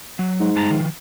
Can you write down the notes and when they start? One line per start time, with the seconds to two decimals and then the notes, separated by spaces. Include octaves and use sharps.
0.19 F#3
0.40 G#2
0.56 G2 A5 A#5
0.71 D#3 F3